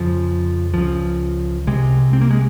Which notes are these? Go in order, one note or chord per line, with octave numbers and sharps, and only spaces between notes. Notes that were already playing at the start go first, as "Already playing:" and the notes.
Already playing: F2 C#3 F3
C#2 C#3 F3
C2 C3 G#3
C4
A#3
G#3